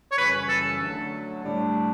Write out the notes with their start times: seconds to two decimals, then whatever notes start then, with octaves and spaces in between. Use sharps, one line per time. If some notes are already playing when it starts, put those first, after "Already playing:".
0.12 C#5
0.18 F#2 C#3 E3 G3 C#4 B4
0.49 A4
0.80 D3 F#3 A3
1.43 A2 G3 D4